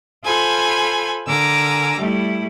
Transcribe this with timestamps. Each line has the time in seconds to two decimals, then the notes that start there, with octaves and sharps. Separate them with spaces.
0.24 F4 A4 C5 G#5 B5
1.27 D3 A#4 G#5 D6 E6 A#6
1.97 G3 A3 E4